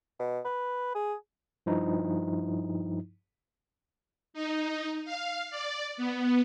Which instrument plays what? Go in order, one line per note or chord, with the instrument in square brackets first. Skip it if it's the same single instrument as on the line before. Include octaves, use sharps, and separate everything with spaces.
[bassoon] B2
B4
G#4
[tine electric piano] G2 F3 D#4 E4
[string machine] D#4
F5
D5
B3